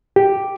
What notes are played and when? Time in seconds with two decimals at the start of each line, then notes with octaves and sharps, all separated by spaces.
0.16 G4